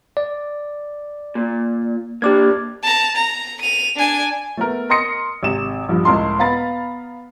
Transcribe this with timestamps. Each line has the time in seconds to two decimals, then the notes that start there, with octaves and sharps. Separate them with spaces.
0.17 D5
1.35 A#2
2.22 A#3 D4 G4 D6 G#6
2.83 A5 A#5
3.16 A#5
3.62 D#7 F7
3.96 D4 G#5
4.57 A3 B3 A#4
4.90 A#4 D#5 C6 D#6 A#6 C#7
5.43 G#1 C3 E7
5.89 A#1 G2 F3
6.05 C#2 A2 A#4 A5 C6
6.39 B3 F5 A#5 B5 A6